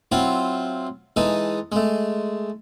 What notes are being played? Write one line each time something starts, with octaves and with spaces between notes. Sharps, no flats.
F#3 C4 E4 F4
E3 G#3 D#4 A4
G#3 A3